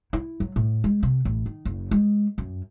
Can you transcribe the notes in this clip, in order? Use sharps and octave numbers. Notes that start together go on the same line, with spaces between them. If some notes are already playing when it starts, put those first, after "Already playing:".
E4
F#3
A2
G#3
C3
A1
D#3
F#1
G#3
F#2